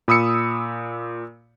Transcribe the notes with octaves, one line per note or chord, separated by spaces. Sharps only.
A#2 B5 D#6 E6 C#7